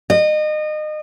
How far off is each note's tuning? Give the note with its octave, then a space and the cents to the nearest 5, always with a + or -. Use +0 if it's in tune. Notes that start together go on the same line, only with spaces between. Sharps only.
D#5 -30